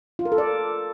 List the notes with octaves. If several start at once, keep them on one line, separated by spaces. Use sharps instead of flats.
F4
A#4
A4
D5